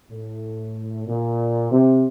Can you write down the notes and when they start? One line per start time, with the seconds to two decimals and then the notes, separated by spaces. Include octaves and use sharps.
0.10 A2
1.07 A#2
1.71 C3